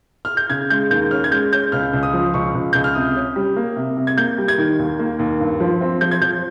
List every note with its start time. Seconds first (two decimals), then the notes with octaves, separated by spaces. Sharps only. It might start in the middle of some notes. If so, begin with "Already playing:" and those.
0.25 F6
0.37 G6
0.50 C#3 G#6
0.70 G#3 G6
0.90 D#2 G6
1.11 C#4 F6
1.24 G#6
1.32 G#3 G6
1.52 C#4 G6
1.72 C#2 F6
1.93 C#2
2.03 D#6
2.13 F3
2.34 C#2 C#6
2.55 C#2
2.73 C#2 G6
2.84 F6
2.95 C3 D#6
3.16 C#4
3.36 G3
3.56 A#3
3.76 C3
3.97 C3
4.07 G#6
4.17 A#3 G6
4.38 G3
4.48 G#6
4.58 D#3
4.79 D#2
4.99 A#3
5.19 D#2
5.40 G2
5.60 F3
5.81 C4
6.01 F3 G6
6.11 G#6
6.21 F3 G6